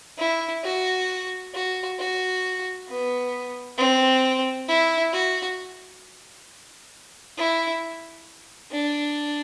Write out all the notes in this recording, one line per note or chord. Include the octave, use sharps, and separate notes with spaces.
E4
F#4
F#4
F#4
B3
C4
E4
F#4
E4
D4